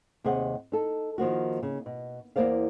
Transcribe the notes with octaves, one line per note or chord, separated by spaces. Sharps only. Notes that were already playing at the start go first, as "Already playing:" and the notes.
D#2 C3 G#4 D#5 F#5
D#4 A4
D#3 F3 A#3 F#4
C#3
B2
E2 D#3 A#3 C5 D5 F5